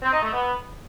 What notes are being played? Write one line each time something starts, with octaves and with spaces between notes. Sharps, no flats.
C4
D#4
A3
B3